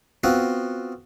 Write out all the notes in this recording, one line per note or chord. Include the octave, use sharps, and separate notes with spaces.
B3 C4 F4 F#4